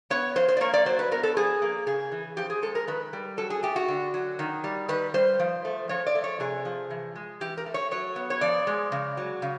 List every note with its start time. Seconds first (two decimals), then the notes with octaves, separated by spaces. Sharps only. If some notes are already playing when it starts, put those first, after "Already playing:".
0.10 B3 C#5
0.36 F3 C5
0.48 C5
0.57 D5
0.61 A#3 C#5
0.74 D5
0.86 F#3 C5
0.99 B4
1.12 B3 A#4
1.23 A4
1.36 F3 G#4
1.62 A#3
1.87 C#3 G#4
2.12 E3
2.37 F3 G4
2.50 G#4
2.62 G#3 A4
2.75 A#4
2.87 D#3 B4
3.13 G3
3.37 F#3 A4
3.50 G#4
3.63 A3 G4
3.76 F#4
3.88 D3
4.14 F#3
4.39 D#3
4.64 G3
4.89 D#3 B4
5.14 G3 C5
5.40 F3
5.65 A3
5.89 F3 C#5
6.07 D5
6.15 A3
6.24 C#5
6.40 C3 G#4
6.65 F3
6.90 E3
7.15 G#3
7.41 E3 G4
7.57 A#4
7.66 A3
7.74 C#5
7.91 F#3 C#5
8.16 B3
8.30 C#5
8.41 F3 D5
8.67 G#3
8.92 C#3
9.17 F#3
9.42 C#3